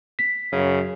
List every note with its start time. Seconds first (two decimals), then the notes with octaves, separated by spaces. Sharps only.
0.19 B6
0.53 F#2 C#3